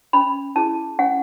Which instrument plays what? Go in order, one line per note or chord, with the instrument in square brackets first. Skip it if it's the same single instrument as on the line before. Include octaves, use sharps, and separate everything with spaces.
[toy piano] C#4 B5
E4 G#4 A5
C#4 F#5